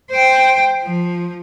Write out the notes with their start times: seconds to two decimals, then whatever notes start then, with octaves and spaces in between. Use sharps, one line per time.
0.11 C5 G5
0.83 F3